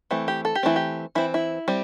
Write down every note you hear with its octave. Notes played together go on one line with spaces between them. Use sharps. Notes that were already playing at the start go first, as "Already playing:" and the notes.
E3 A3 C4
G4
A4
G4
E3 A3 C4 E4
G4
E3 C4 E4
E4
G3 C4